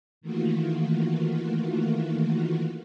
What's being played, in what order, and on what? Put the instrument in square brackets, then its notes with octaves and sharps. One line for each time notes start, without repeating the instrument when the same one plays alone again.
[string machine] D#3 E3 A3 A#3 F4 F#4